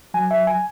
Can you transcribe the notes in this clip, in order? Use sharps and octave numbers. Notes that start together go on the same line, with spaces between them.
F#3 G#5
E5
G#5